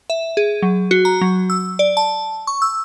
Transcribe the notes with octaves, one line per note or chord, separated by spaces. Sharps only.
E5
G#4
F#3
F#4
A#5
F#3
E6
D5
A5
C#6
E6